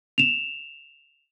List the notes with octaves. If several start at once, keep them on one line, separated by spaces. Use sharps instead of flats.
E7 F7